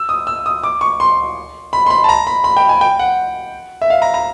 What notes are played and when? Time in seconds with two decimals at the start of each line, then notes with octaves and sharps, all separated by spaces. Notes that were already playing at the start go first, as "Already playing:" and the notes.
Already playing: E6
0.09 D#6
0.27 E6
0.46 D#6
0.63 D6
0.81 C#6
1.00 C6
1.73 B5
1.86 C6
1.90 B5
2.04 A5
2.09 A#5
2.27 B5
2.44 B5
2.57 G5
2.69 G#5
2.81 G5
2.99 F#5
3.82 E5
3.90 F5
4.02 A#5
4.14 A#5